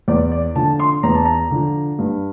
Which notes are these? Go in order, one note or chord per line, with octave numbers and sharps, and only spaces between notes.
E2 D5
D5
D3 F3 A5
C6
E2 A#5
A5
A#5
D3 F3
G2